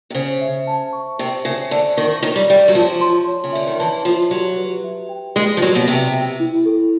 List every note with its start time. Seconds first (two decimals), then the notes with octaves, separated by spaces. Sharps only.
0.10 C3
0.15 C#3 C5
0.41 E5
0.67 A5
0.93 C#6
1.18 C3 C5
1.45 C#3 E5
1.71 D3 A5
1.97 D#3 C#6
2.22 D#3 C#5
2.36 G3
2.49 G3 E5
2.68 F#3
2.75 F3 A5
3.01 C6
3.27 C#5
3.44 C#3
3.53 D3 E5
3.67 D#3
3.80 E3 A5
4.05 F3 C6
4.31 F#3 G4
4.57 B4
4.84 E5
5.09 G5
5.36 G#3 G4
5.57 F3
5.62 F#3 B4
5.75 B2
5.88 C3 E5
6.14 G5
6.40 E4
6.66 A4